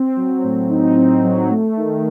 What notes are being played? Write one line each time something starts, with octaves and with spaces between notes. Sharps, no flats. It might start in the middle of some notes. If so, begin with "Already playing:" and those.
Already playing: C4
F#3
A2
D#4
C4
F#3
A3
D#3